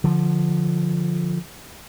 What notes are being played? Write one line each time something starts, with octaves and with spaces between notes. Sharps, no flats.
D3 F3